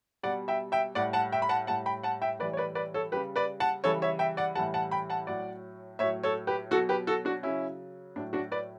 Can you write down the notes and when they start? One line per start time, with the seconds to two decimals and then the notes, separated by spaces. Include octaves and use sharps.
0.23 B2 G3 D5 F#5
0.48 E5 G5
0.72 E5 G5
0.95 A2 G3 D5 F#5
1.13 F#5 A5
1.32 E5 G5
1.42 B5
1.49 F#5 A5
1.67 A2 G3 F#5 A5
1.86 G5 B5
2.03 F#5 A5
2.22 E5 G5
2.39 A2 E3 G3 B4 D5
2.53 C#5
2.57 B4 D5
2.75 B4 D5
2.94 A4 C#5
3.12 G3 G4 B4
3.16 C#3
3.36 B4 D5
3.60 F#5 A5
3.84 C#3 E3 G3 A4 C#5
4.02 C#5 E5
4.19 E5 G5
4.37 D5 F#5
4.55 A2 E3 G3 F#5 A5
4.74 F#5 A5
4.91 G5 B5
5.10 F#5 A5
5.27 A2 F#3 D5 F#5
5.99 A2 C#5 E5
6.03 F#3
6.23 A4 C#5
6.47 G4 B4
6.71 B2 F#4 A4
6.75 F#3
6.89 G4 B4
7.07 F#4 A4
7.25 D4 F#4
7.43 C#3 F#3 C#4 E4
8.16 A2 F#3 D4
8.33 D4 F#4
8.51 B4 D5